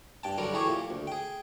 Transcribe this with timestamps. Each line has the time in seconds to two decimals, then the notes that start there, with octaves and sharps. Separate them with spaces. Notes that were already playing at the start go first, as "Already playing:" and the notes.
0.23 G2 G5 A5
0.38 D3 F#3 G3 A#4
0.53 E3 A3 G4 G#4 C#5
0.68 A#2
0.90 D2
1.07 G#4 G5